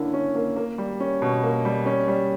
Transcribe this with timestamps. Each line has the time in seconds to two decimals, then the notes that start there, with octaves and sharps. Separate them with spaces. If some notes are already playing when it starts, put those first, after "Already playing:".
Already playing: D3 A#3 C#4 E4
0.14 C#4
0.35 A#3
0.56 A#3
0.78 G3
1.00 C#4
1.22 B2
1.43 A#3
1.65 G3
1.86 C#4
2.08 G3